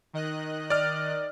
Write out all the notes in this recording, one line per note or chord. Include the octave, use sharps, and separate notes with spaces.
D#3 D#5 F#6
D5 F6